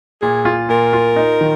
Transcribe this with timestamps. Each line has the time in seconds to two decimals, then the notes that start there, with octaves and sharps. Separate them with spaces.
0.22 A#2 G#4
0.45 F4
0.69 A#2 A#4
0.93 F4
1.16 D#4
1.41 D#3